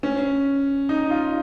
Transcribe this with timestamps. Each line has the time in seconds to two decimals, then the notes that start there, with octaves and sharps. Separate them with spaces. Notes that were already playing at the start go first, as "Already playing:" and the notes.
0.03 C#4
0.89 D#4
1.10 F4